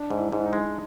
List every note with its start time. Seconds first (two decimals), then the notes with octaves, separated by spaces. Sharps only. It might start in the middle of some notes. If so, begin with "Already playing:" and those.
Already playing: D4
0.10 G#2
0.17 E4
0.32 G#2 E4
0.45 D#4
0.53 G#3